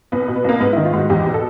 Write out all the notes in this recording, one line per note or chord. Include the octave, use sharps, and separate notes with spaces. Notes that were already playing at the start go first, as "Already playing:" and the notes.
C2 B3
B2
B3
C2 A#3
G#2 B3
E4
D#3
F4
G#2 F#4
E2 G4
B2
A4